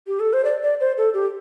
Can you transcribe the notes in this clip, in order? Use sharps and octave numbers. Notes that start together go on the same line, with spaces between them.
G4
A4
C5
D5
D5
C5
A4
G4